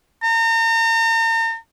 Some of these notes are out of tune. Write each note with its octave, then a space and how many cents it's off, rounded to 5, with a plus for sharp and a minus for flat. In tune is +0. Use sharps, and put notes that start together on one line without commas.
A#5 -40